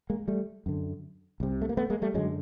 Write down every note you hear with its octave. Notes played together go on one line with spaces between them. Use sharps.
G#3 A#3
G3 A3
F#2 D3
C2 C3
A3
A#3
A3 B3
G#3 A#3
G3 A3
F#2 D3 F#3 G#3